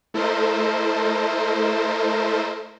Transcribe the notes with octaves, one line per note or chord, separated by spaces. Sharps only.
A3 E4 A4 A#4 C5 D#5